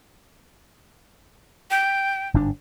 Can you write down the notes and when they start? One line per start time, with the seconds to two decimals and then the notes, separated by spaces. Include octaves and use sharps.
1.71 G5
2.34 G1 G#2 D4